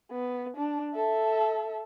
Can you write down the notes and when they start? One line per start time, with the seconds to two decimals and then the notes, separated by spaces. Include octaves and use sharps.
0.11 B3
0.57 D4
0.95 A4 E5